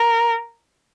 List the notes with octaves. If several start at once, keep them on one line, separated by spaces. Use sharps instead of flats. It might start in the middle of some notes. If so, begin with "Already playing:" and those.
Already playing: A#4